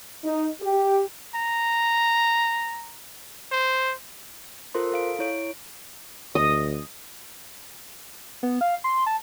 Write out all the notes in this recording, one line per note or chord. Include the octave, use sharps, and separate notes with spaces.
D#4
G4
A#5
C5
F4 A4 A#4 C5 C6
A4 F5 D7
E4 C#5 D7
D2 D#5
B3
F5
C6
A5